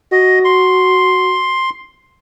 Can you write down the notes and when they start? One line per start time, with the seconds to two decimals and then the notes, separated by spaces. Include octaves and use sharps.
0.12 F#4 D#5
0.45 C6